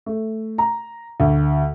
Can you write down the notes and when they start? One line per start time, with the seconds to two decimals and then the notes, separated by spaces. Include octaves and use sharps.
0.06 A3
0.58 A#5
1.20 D2